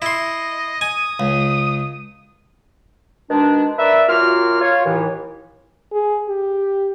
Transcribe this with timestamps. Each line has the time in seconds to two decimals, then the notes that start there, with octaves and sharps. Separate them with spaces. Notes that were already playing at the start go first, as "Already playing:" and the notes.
0.02 E4 D#5 C6
0.81 G#5 D#6
1.20 C#2
3.31 B2 D#3 G#3 D4
3.79 A#4 B4 D5 E5
4.09 F#2 A#3 F4 F#4 F6
4.61 F4 C#5
4.86 D#2 A2 E3
5.93 G#4
6.29 G4